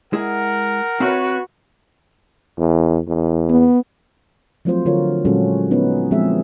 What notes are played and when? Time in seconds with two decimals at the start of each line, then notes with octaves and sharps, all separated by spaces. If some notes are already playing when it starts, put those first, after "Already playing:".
0.13 G#3 E4 G#4 A#4 F#5
1.00 C4 F#4 B4 C#5 E5 B5
2.58 E2
3.07 E2
3.50 B3
4.65 F3 F#3 A3 C4 F4 C5
4.86 D3 F4 F#4 A#4 C#5
5.25 A#2 F#3 G#3 C#4 F#4 A4
5.71 B3 C#4 D#4 B4
6.11 F3 G#3 C4 G#4 E5